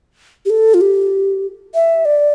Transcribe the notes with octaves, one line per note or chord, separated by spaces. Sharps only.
G4
A4
F4
G4
E5
D5